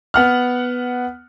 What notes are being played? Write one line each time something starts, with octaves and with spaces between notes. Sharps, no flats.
B3 F#5 F6